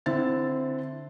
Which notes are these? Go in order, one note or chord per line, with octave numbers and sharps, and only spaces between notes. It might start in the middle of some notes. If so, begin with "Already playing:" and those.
D3 C4 E4 A6